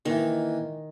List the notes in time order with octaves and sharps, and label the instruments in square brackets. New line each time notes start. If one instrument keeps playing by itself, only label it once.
[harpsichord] A#2 E3 [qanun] D#3